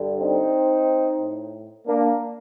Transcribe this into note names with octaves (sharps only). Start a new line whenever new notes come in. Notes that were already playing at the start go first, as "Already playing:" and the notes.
Already playing: G2 D3
C4 D#4
A2
A#3 D4